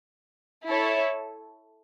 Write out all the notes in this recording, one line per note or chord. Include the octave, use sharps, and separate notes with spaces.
E4 A4 C#5